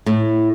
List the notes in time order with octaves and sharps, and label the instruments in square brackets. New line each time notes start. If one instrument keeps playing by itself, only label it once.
[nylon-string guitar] A2